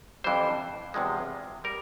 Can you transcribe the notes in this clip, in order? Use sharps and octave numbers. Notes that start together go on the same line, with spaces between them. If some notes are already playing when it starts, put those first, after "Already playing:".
F2 E3 G3 C5
E2 C3 F3 G#3
G3 A#4